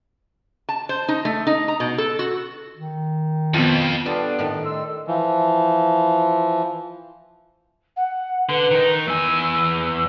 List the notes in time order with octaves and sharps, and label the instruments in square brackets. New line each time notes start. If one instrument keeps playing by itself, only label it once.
[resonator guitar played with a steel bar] A5
C5
D#4
A3
D#4
A#5
B2
A4
F#4
[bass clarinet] D#3
[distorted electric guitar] F2 [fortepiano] B2 F3
[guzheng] G3 F4 A4 [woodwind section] B3 D4
[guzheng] A2 D#3 A3
[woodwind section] D#4 C6 E6
[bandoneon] E3 F3
[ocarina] F#5
[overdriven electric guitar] D3 [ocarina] B4
[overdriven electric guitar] D#3 D#4
[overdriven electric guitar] E2 G#5 [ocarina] E6